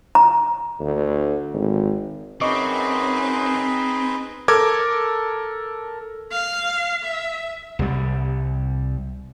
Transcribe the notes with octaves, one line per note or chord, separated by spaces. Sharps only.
A#5
D2
G#1
F#2 C4 D#4 G#4 B4 D#5 C#6 D6
A4 A#4 D6 G#6
F5
E5
C2 G3